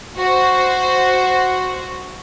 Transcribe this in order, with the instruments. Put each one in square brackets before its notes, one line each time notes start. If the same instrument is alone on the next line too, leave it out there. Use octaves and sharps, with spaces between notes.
[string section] F#4 C5